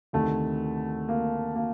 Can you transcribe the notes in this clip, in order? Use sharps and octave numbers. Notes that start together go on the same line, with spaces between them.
D2 C3 D#3 A3
A#3
A#3